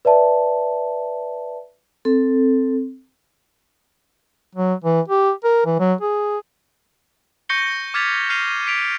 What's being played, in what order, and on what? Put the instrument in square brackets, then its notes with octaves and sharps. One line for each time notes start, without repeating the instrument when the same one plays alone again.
[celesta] B4 D5 E5 A5
[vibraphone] C4 A4
[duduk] F#3
E3
G4
A#4
E3
F#3
G#4
[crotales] C#6 G6 A#6 C#7 G7
D6 F6 G#6 A6 B6 F7
F6 G6 C7 D#7 F7 G7
B6 D7 F7